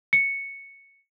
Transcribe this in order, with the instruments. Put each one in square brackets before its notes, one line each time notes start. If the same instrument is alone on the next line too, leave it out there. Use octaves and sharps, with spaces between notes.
[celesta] C#7